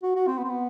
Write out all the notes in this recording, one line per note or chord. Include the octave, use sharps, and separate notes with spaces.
F#4
F#4
C4
B3
C4
B3